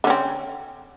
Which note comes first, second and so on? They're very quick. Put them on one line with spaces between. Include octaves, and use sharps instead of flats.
D3 C#4 C4